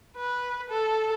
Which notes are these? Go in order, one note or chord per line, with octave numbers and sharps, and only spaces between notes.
B4
A4